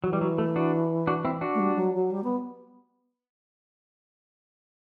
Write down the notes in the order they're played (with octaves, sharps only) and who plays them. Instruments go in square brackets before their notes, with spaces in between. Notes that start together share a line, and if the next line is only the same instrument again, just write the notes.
[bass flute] E3 [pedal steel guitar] F#3
[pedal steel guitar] G3
F#3
A3
D4 F#4
D4 F#4
C4 E4
D4 F#4
[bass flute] A3
G3
F#3
F#3
G3
B3